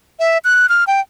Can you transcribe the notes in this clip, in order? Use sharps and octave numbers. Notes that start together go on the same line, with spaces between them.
E5
F#6
F6
G5